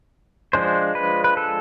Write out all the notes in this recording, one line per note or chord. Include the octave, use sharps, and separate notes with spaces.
F3 G#3 D4 C5
B4
B4
A4